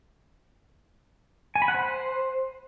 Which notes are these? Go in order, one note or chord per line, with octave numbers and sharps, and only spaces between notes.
G#5
B5
F#5
C5